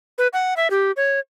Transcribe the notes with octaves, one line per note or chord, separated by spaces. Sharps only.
B4
F#5
E5
G4
C#5